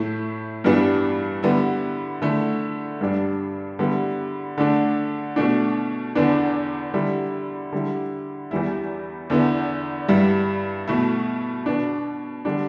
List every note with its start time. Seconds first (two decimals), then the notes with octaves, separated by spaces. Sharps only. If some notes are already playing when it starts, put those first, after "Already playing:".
Already playing: A2 A3 E4
0.64 G2 E3 G3 B3 D4
1.43 D3 G3 B3 E4
2.22 D3 A3 E4
3.01 G2 G3 D4
3.79 D3 G3 B3 E4
4.58 D3 A3 D4
5.36 B2 A3 D4
6.15 E2 D3 B3 D4
6.94 D3 G3 E4
7.73 D3 G3 E4
8.51 E2 E3 G3 E4
9.30 E2 D3 B3 E4
10.08 G2 G3 E4
10.88 B2 A3 E4
11.66 B2 B3 D4
12.45 D3 G3 D4